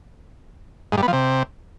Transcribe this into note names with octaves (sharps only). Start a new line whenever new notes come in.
G#2
G2
B3
F3
C3